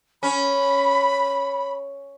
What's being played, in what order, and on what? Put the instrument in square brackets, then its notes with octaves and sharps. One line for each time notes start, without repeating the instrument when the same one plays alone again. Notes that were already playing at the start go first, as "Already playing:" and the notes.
[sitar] C#4 [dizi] B5